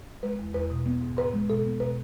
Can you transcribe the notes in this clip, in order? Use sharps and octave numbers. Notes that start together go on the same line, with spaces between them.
G#3 B4
E2
E2 B4
B2
B3
G#2
G#2 B4
G#3
B2 A4
B3
B2 B4